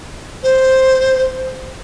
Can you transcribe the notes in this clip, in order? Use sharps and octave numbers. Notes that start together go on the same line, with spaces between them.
C5